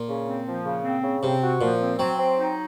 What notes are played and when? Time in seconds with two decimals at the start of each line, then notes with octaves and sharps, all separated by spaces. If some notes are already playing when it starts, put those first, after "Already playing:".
Already playing: A#2
0.09 C#3
0.27 C4
0.47 F3
0.65 C#3
0.84 C4
1.03 C#3
1.22 C3 C4
1.41 F#4
1.61 A#2 F3
1.80 C4
1.98 F#3 C4
2.19 C4
2.37 D#4